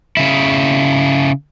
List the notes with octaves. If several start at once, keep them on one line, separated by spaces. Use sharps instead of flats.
C#3 E4